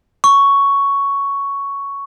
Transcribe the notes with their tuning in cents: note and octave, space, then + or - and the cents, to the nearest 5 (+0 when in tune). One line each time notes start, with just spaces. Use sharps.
C#6 +5